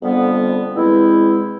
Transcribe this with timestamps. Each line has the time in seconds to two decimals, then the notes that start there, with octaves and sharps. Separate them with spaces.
0.01 F2 D3 G3 B3
0.74 E2 B2 G#3 C4 E4